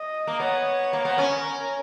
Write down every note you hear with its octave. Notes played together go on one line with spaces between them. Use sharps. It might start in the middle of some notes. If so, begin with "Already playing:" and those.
Already playing: D#5
A#3
B3 C#5
A#3
B3
C#4 A#4